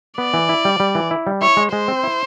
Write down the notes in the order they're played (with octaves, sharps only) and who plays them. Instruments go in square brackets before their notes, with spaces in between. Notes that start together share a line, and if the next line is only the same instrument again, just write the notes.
[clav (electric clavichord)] B3 [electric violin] D5
[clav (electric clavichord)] E3
E4
G3
G3
E3
E4
G3
[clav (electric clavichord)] E4 [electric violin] C#5
[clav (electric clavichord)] G#3
[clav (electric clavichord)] G#3 [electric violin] C5
[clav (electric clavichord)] C4
E4